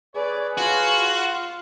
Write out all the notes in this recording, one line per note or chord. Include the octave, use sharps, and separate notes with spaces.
G#4 B4 C#5 D5
F4 F#4